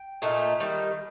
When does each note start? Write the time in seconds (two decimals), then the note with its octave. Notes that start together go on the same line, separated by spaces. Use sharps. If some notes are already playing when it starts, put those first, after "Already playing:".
Already playing: G5
0.22 A#2 A3 D#4
0.60 D#3 G3